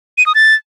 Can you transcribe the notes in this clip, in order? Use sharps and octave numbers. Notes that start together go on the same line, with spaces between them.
D#7
D#6
A6